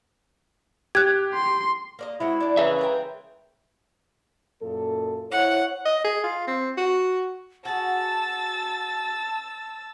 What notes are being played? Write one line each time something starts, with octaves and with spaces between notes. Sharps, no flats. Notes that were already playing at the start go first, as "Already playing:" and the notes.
G4 F#6 G#6
C6
A#3 D5 D#5
G#3 C4 E4 F#4
D4 D5
C#3 A#4 B4 E5
G#3 A#4 G5
F#2 A#2 A4
E4 C5 C#5 F#5
D#5
G#4
F4
C4
F#4
F#4 G#4 A5 E6 A6